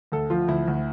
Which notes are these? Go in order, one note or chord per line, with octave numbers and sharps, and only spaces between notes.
D2 A4
F3 F4
D2 E4
D2